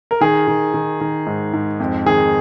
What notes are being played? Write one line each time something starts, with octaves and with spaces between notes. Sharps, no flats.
A#4
D#3 G#4
D#3
D#3
D#3
G#2
G#2
F2
D#3 G#4